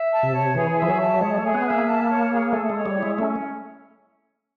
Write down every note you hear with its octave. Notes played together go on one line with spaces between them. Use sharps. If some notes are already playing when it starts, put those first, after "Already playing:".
Already playing: E5
A5
C3
C#5
E3 G#4
E5
F3
F#3
A5
G#3 C#5
A3
G#4
B3
E5
A#3
A5
C#5
G#4
A3 A4
G#3
C#5
G3
E4
G#3
A3 C#4